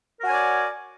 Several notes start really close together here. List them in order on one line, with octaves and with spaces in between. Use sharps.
A#4 F#4 G#5 C#5 D5